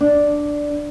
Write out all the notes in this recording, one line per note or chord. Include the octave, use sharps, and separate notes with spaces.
D4